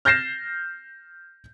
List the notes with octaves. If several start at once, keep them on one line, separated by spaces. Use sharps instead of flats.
F6 G6 A6 A#6 C7 E7